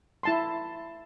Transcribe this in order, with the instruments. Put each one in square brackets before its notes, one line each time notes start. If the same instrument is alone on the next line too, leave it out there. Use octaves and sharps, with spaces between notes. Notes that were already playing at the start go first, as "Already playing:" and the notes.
[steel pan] E4 A5 C6